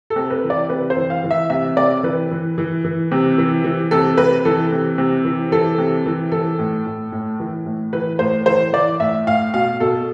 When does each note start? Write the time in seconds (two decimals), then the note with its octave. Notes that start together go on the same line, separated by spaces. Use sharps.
0.10 A4
0.16 C3
0.30 B4
0.44 E3
0.50 D5
0.69 C3 B4
0.90 C5
0.97 E3
1.10 F5
1.24 E3
1.31 E5
1.50 C3 E5
1.77 C3 D5
2.03 E3 B4
2.31 E3
2.58 E3
2.84 E3
3.12 C3
3.38 E3
3.64 E3
3.91 C3 A4
4.17 C3 B4
4.45 E3 A4
4.72 C3
4.98 C3
5.25 E3
5.52 E3 A4
5.78 C3
6.06 E3
6.32 E3 A4
6.59 A2
6.86 A2
7.12 A2
7.40 E3
7.66 A2
7.93 E3 B4
8.19 A2 C5
8.46 E3 C5
8.73 E3 D5
9.00 A2 E5
9.27 A2 F5
9.54 B2 F5
9.80 B2 A4